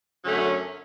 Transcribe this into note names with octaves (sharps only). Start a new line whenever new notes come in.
F#2 D3 F#3 A3 C#4